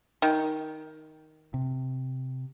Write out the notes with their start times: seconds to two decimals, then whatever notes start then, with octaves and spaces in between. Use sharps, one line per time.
0.22 D#3
1.54 C3